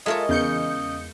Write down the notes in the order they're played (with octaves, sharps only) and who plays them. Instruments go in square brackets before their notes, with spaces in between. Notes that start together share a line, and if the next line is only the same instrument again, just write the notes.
[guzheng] G#3 A#4 C#5 [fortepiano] F4 A4 E5 [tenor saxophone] D#5
[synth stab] E2 G6 C#7 [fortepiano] C#3